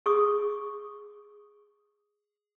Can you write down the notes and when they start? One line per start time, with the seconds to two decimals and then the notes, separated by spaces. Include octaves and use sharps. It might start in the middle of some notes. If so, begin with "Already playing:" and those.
0.06 G#4 C#6 D#6